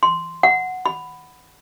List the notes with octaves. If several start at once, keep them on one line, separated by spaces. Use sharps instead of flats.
C6
F#5
B5